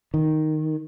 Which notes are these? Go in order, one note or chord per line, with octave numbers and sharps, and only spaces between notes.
D#3